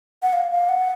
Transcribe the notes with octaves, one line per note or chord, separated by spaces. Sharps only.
F#5
F5
F5
F#5